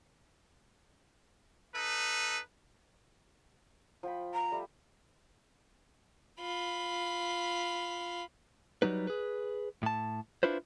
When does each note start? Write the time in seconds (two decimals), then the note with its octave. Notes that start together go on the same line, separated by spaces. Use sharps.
1.75 D#4 A4 B4
4.03 F3 G5 B5
4.34 A#5
4.52 G3 A3 F5
6.40 F4 B5
8.82 F#3 G3 D#4 B4
9.07 G#4 B4
9.83 A2 A5
10.43 D4 E4 F4 B4 C5